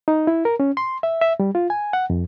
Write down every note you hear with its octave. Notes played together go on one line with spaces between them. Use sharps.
D#4
E4
A#4
C#4
C6
E5
E5
G3
F4
G#5
F#5
F2